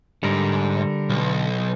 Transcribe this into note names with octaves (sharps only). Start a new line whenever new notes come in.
G#2 D3 G3 A#4
B1